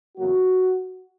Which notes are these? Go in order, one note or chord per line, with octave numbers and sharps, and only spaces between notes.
E2 C#3 F#3 A#3 F#4